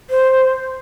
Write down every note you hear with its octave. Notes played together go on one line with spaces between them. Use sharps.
C5